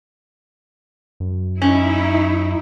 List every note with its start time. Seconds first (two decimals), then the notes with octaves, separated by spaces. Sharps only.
1.20 F#2
1.62 C#4 D#4 E4